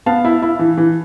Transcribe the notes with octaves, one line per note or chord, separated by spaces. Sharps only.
B3 F5 A5
E4
E4
E3
E3